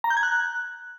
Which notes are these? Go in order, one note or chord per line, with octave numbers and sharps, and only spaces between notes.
A#5
G6
G#6
F#6